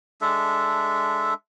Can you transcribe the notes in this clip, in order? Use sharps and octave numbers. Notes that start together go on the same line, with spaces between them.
G#3 D4 A4 E5